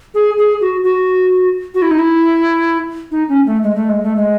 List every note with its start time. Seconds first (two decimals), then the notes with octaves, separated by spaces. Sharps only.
0.14 G#4
0.38 G#4
0.61 F#4
0.84 F#4
1.75 F#4
1.82 E4
1.91 D#4
1.99 E4
3.11 D#4
3.29 C#4
3.46 A3
3.63 G#3
3.76 A3
3.89 G#3
4.03 A3
4.16 G#3